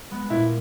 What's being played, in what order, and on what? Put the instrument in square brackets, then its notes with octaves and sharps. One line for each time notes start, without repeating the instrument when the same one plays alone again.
[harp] G#3 B3
[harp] A#2 [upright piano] E4